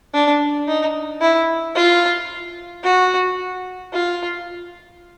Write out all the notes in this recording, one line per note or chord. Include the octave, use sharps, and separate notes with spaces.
D4
D#4
E4
F4
F#4
F4